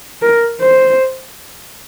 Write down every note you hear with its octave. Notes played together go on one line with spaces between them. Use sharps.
A#4
C5